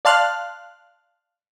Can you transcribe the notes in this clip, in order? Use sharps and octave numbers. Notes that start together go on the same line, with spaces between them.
D5 F5 A5 C6 F6 F#6